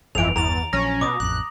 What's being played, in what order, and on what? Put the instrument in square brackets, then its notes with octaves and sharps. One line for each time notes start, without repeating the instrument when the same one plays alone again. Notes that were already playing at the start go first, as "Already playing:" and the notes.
[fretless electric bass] G1 [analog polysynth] F2 E3 [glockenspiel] D7 F7
[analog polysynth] E2 A6 [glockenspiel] A#5 F7
[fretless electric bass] A#1 F3 F#3 [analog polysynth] C#4 [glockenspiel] A#6
[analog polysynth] B2 [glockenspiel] D6 D#6
[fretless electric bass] A1 F2 [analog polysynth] F#6